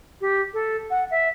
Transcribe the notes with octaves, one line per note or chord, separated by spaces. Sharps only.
G4
A4
F#5
E5